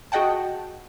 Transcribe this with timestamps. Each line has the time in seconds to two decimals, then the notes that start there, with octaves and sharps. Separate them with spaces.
0.12 F#4 G#4 D#5 F#5 G5 A5